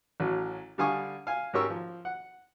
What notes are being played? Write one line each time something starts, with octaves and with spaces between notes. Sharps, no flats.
A1 F#3
D3 G3 F5 G#5 C#6 D#6
F5 G#5
G#2 C#4 G4 A#4 C#6 E6
F3
F#5